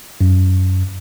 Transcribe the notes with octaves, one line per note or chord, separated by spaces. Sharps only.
F#2